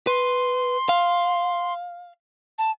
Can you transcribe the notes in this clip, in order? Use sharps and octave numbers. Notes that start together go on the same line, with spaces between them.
B4 C6
F5
A5